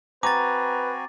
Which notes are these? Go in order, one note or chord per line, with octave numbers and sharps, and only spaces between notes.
C4 F#4 B4 G#5 A#5 D6 A6